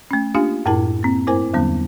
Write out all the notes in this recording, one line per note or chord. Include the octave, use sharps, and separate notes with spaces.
A3 C#4
A#3 D4 F4 G4 F5 G#5
F#2 A2 E4 G#4 A#4 A5
A#3 C4
G2 A3 E4 A#4 C5 G#5
E2 D3 F#3 G3 B3 C#4